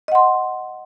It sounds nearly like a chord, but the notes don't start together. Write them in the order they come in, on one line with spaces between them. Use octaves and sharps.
D#5 F#5 C6